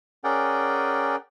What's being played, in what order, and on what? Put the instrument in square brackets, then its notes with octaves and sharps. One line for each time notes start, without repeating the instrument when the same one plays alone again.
[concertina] C#4 G#4 A#4 D5 F#5 G5